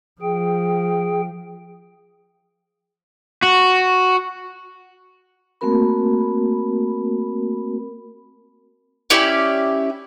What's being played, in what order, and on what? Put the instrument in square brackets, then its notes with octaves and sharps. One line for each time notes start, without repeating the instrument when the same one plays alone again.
[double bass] F3 [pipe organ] G#4 G5
[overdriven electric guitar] F#4
[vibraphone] A3 A#3 C4 F#4 A#4 B5
[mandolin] C#4 E4 G4 D5